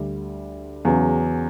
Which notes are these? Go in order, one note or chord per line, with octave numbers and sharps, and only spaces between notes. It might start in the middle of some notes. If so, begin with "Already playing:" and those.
Already playing: D2 D3 G3
E2 C#3 F#3